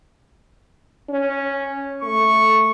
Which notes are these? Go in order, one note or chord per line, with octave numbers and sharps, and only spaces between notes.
C#4
A3 C#6